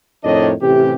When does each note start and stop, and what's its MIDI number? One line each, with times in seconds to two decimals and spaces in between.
0.24 0.51 41
0.24 0.51 45
0.24 0.51 51
0.24 0.51 62
0.24 0.51 73
0.24 0.51 75
0.61 0.94 33
0.61 0.94 48
0.61 0.94 52
0.61 0.94 67